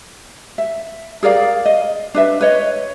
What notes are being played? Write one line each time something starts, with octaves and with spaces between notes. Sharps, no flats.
E5
G#4 A#4 D5 F5
D#5
D4 B4 E5
B4 C#5 D#5